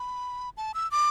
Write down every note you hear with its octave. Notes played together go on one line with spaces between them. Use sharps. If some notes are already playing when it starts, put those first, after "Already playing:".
Already playing: B5
A5
E6
D6